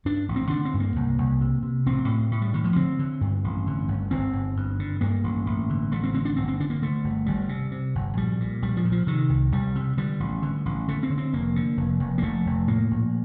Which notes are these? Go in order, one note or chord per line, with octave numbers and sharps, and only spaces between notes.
G2 D4
A1
C4
D3 D4
C4
G2
A#3
C2
C2
C3
C3
A1 C4
A2
A2
G3
A2 D#3
F3
D3 C4
D3
G2
A1
D3
G1
G1 C4
G1
G2
D3
G2 A#3
A1
A1
D3
A1 A3
C4
D3 C4
D4
G1 C4
C4
D3 D4
A#3
D3 A3
G1
G1 G3
C3
C3
G1
A#1 G3
A#2
A#1 G3
F3
A#2
F3
C3 D#3
C2
C2 G3
C3
D3 G3
A1
D3
A1
D3 A3
C4
D3
C4
F1 A#3
D3
F1
F1
A#3
F1 A3
F1
A2 A#3
A#1